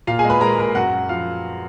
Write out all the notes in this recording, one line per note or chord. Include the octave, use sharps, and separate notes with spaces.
A#2 F4 F5
G#4 G#5
G#3
B4 B5
G#3 A#4 A#5
A#2 A#4 A#5
F#2 F#4 F#5
F#2
F3 F4 F5